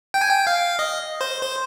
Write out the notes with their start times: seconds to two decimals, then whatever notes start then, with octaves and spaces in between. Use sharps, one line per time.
0.14 G5
0.21 G#5
0.30 G5
0.47 F5
0.79 D#5
1.21 C5
1.43 C5